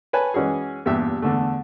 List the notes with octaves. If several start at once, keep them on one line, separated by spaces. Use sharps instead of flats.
B4 C#5 G#5 A5
E3 G#3 C#4 F#4 G#4
E2 G2 A#2 G4 E5
E2 D3 A3